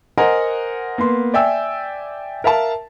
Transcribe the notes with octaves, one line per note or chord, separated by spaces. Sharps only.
A#4 C5 D#5 F#5 G#5 A#5
A#3 B3 C6
D5 E5 G5 G#5 E6
A#4 E5 F5 A5